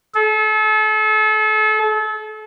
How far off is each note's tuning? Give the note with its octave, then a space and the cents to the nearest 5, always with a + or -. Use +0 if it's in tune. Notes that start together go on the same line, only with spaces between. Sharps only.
A4 -35